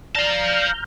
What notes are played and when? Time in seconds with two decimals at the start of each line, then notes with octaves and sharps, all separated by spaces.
0.16 D5 F5 A5 A#5 F6 G6